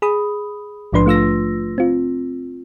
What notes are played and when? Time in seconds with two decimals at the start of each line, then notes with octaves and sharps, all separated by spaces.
0.02 G#4 B5 D#6
0.93 A#1 G#2 F3 D4 B4 C6
1.06 A3 F4 E6 A#6
1.78 C4 F4